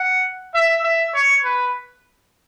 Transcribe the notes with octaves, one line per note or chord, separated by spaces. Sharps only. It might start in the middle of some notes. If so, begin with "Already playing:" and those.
Already playing: F#5
E5
E5
C#5
B4